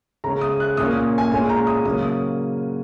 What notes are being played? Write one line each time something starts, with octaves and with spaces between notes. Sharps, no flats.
C#3 G#3 C#4 A#5
D#6
F#6
A#2 A#3 C#4 D#6
G#5
A#2 G#3 C#4 G#5
A#5
D#6
C#3 F#3 A#3 C#4 D#6
D#6